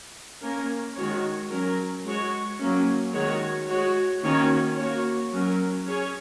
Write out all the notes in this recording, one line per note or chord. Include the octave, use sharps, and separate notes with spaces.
A#3 C#4 A#4
D#3 G#3 F#4 C#5
F#3 C#4 A#4
G#3 F#4 C#5
F#3 A#3 C#4
D#3 G#3 F#4 C#5
G#3 F#4 C#5
D#3 A#3 C#4 F#4 C#5
A#3 F#4 C#5
F#3 C#4 A#4
C#4 G#4 C#5